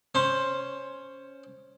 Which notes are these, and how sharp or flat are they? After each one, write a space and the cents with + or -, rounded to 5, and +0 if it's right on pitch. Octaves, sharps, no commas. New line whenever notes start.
C#4 +0 C5 +10